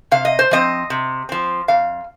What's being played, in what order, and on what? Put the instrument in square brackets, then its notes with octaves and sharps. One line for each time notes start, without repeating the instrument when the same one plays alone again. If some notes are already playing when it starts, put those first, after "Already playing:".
[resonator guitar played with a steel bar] C3 F5
D#5
C5
F3 C4 D#5
C3
F3 C4
F2 F5